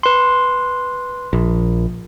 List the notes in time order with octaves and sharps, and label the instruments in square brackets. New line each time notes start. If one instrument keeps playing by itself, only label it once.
[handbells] B4 C6
[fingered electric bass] A#1